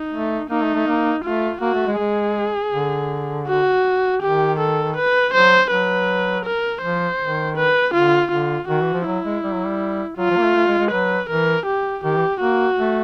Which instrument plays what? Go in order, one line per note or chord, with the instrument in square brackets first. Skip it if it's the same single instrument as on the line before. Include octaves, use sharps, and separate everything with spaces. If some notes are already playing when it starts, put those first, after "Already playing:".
Already playing: [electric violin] D#4
[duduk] A3
[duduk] A#3 [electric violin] D#4
[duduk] A3
A3
A#3
[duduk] A3 [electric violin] F4
[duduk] A#3 [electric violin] F#4
[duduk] A3
G#3
[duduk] G#3 [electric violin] G#4
[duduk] D3
[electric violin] F#4
[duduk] D#3 [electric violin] G4
[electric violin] A4
B4
[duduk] F#3 [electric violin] C5
[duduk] F#3 [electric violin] B4
[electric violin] A#4
[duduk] F3 [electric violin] C5
[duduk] D#3
[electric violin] B4
[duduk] D3 [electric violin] F4
[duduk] D3 [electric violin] F4
[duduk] D#3 [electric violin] F#4
[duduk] E3
F3
[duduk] F#3 [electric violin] E4
[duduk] G#3
G3
F#3
G3
[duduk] F#3 [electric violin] F4
[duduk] F3
A#3
A3
A3
G#3
G#3
[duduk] F#3 [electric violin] B4
[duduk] E3 [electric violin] A#4
[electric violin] G4
[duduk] D#3 [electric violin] G4
[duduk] E3
[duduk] A#3 [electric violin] F#4
[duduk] A3